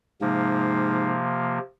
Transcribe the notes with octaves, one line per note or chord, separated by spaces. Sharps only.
G#2 C3 F3 A#3